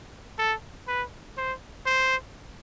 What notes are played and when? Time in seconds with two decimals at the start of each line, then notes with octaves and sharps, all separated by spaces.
0.39 A4
0.88 B4
1.38 C5
1.86 C5